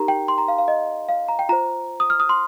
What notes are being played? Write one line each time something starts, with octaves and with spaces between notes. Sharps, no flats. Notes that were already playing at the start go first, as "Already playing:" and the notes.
Already playing: D#4 G4 A#4 A#5
G5
C6
A#5
F5
F5
D#5
F5
A#5
G5
F4 C5 A#5
D#6
F6
D#6
C6